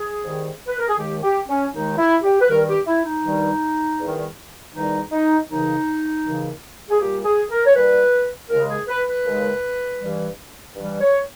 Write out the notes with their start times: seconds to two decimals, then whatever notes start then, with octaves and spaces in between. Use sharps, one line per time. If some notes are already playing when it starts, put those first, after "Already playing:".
Already playing: G#4
0.23 G#2 D#3 G3
0.68 B4
0.79 A#4
0.88 G#4
0.98 D#2 D#3 G#3 G4
1.23 G4
1.48 C#4
1.74 D#2 D#3 G#3 D#4
1.98 E4
2.23 G4
2.40 B4
2.48 G2 D#3 G3 A#4
2.67 G4
2.87 E4
3.05 D#4
3.24 G2 D#3 G3
3.99 E2 D#3 G3
4.74 E2 D#3 G3 D#4
5.11 D#4
5.49 D#2 C#3 E3 D#4
6.25 D#2 C#3 E3
6.91 G#4
6.99 A#2 G3 G4
7.24 G#4
7.50 A#4
7.65 C#5
7.75 A#2 G3 B4
8.50 D#2 C#3 G#3 A#4
8.69 G#4
8.88 B4
9.07 B4
9.25 D#2 C#3 G#3
10.00 G2 E3 G3
10.75 G2 E3 G3
11.01 C#5